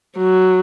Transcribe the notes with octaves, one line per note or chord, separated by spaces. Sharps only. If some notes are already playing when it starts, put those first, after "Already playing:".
F#3